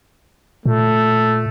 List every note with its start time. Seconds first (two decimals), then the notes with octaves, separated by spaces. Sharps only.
0.66 A#2 A3